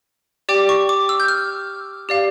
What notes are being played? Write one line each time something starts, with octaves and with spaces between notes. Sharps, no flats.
G4 D5 G5 D6
C#6
D6
E6
G6
F6
G4 D5 F5